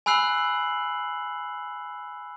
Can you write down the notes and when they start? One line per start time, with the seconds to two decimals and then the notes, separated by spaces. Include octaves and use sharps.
0.06 G#5 B5 E6 F#6 C7 F#7